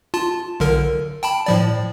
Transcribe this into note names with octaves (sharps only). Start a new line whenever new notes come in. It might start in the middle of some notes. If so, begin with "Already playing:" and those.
F4 A5
B1 D3 A#4
G5 A5 B5
A2 F3 D5